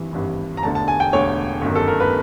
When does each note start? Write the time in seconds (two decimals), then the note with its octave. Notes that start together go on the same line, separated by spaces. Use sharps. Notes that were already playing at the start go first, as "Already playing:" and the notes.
Already playing: G#1 G2 E3
0.13 G#1 G2 E3
0.57 A#5
0.63 E1 D2 D3 A5
0.75 A5
0.88 G#5
1.00 G5
1.13 E1 D2 D3 C#5
1.62 G1 F#2 D#3
1.75 A4
1.88 A#4
2.00 B4